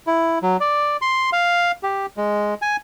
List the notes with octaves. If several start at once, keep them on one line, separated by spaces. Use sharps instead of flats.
E4
F#3
D5
C6
F5
G4
G#3
G#5